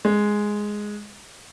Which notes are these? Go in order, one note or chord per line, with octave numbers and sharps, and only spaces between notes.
G#3